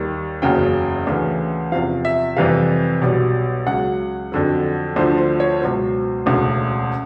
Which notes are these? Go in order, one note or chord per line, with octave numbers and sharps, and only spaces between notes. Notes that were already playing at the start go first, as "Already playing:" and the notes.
Already playing: D#2 D#3 G3
F#1 E2 C#3 F#3 G5
D2 C#3 E3
E2 C3 F3 F5
E5
F2 C3 E3 G3 F5
B1 B2 G3
C#2 C#3 F#3 F#5
F2 D3 F#3
D2 D3 F3 C5
C5
C#5
C#2 B2 F#3 C5
E1 D2 C#3